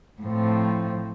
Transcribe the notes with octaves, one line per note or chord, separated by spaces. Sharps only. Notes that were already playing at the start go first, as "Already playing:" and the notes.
A2 F3 C4